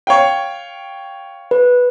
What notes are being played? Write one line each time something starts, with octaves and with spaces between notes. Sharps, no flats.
C#5 F5 G5
B4